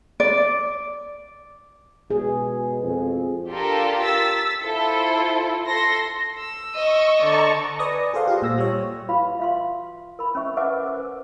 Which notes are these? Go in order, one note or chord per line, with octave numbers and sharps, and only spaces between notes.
D5
B2 G#4
F2
D4 F4 G4 A4 A#4
E6 A6 B6
E4 F4 A4 C5
A4 C6 A#6
E6
D#5 C#6
D3 D5 A5 A#5 C#6
B4 D5 G#5 D#6 A#6
G#4 A4 C5 F5 F#5 C6
F4 G4
A#2 E6 A#6
G3 C#5
F4 F#4 B4 F5 B5
E5 F5 C6
A#4 B5
C#4 A#4 C5 E5 C#6
A#4 B4 E5 F#5 G#5 D6
A#4 C5